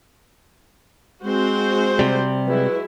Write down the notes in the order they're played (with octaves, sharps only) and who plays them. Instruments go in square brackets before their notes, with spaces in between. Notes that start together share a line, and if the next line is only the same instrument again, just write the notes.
[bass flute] G#3 [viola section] C4 F#4 C5
[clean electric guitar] C3 G3
[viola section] F#3 G#3 E4 [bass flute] B4